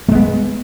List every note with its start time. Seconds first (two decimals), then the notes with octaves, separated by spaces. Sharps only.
0.09 A3
0.12 G#3
0.15 B3